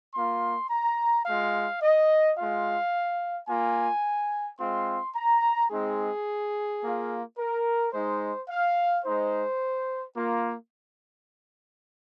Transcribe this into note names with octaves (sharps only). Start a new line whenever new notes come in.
A#3 F4 C6
A#5
G#3 F4 F5
D#5
G#3 F4 F5
A#3 F4 G#5
G#3 C4 F4 C6
A#5
G#3 C4 D#4 G#4
A#3 F4
A#4
G#3 D#4 C5
F5
G#3 D#4 C5
A#3 F4